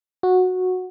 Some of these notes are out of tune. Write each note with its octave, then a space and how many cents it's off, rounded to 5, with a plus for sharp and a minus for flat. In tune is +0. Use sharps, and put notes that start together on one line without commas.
F#4 -10